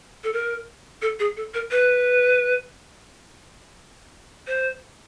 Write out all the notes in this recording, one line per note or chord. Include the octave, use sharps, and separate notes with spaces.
A4
A#4
A4
G#4
A4
A#4
B4
C5